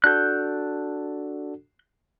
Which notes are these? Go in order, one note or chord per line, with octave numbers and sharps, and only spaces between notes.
D4 F#4 A4 F#6 G6